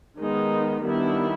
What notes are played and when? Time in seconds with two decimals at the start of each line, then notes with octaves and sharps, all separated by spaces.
0.19 D#3 G#3 B3 D#4
0.84 D#3 G3 B3 D4 E4